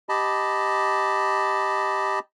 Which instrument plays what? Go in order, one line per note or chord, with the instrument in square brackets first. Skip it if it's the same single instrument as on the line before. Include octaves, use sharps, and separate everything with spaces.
[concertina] G4 D#5 A5 B5